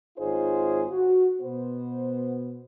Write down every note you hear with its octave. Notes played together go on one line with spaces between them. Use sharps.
G#1 D#4 F4 G#4 C5 C#5
F#4
B2 B3 C5